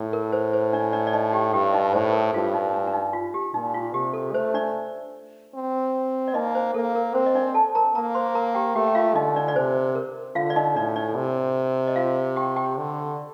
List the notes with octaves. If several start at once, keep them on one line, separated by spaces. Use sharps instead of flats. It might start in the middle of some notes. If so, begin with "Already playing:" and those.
Already playing: A2
A#4
C5
C5
D4 D5
D4 D5
D5
D#4 D#5
G4 G5
G2 G4 G5
D#4 D#5
A2 C5
A#4
G2 F4
D#4
D4
D4
D#4
F4
G4
A#2 D#4
F4
C3 G4
A4
A3 C5
D4 D5
C4
D5
A#3 D#4 D#5
C5
A#3 A4
A#4
C4 C5
D#5
D4 D5
A4 A5
A#4 A#5
A#3 A#4 A#5
C5 C6
A#4 A#5
G4 G5
A3 G4 G5
G5
F4 F5
D3 D#4 D#5
D4 D5
D5
C3 C5
A#4
D3 F4 F5
D5
D#4 D#5
A2 D4 D5
D4 D5
C3
D#5
F4 F5
G4 G5
G4 G5
D3